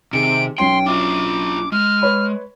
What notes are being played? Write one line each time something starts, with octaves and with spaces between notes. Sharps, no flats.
C3 D#3 G#4 C#7 D7
B1 C#4 G5 C6 C7
D4 F4 D6
G#3 F6
B4 C#5 B5